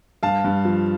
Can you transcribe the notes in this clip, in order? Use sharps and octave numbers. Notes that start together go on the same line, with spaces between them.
G2 F5 A5
G2
F3